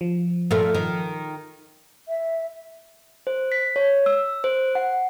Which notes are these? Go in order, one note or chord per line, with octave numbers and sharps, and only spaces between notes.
F3
A#2 A3
D#3
E5
C5
B6
C#5
E6
C5
F#5